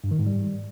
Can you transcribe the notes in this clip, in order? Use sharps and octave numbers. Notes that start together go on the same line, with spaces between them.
G2
D#3
G#2
G3